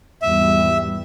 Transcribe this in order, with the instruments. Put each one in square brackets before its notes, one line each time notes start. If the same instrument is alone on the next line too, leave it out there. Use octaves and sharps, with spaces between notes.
[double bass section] G#1 E2 G3 [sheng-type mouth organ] E5